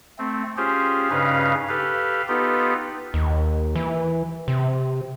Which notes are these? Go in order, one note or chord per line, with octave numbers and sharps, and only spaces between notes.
A3 C4
C#4 F4 G4 G#4 C5
G2 C#3 C#4 D#4 B4 F5
G4 A4 B4 F5
B3 D#4 F4 G4 A4 B4
D#2
E3
C3